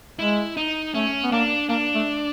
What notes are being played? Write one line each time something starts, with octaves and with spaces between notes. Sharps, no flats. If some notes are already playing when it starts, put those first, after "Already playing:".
G#3 E4
D#4
A3 C#4
B3
A#3 D4
A#3 D4
A3